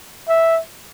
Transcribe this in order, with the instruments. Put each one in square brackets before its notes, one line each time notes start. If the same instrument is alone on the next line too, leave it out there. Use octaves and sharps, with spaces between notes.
[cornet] E5